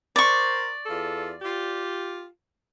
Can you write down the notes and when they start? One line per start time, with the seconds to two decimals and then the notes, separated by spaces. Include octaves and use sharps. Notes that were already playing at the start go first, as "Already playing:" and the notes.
0.16 A#4 C5 D5 C#6
0.86 E2 F4 A4
1.42 F4 G4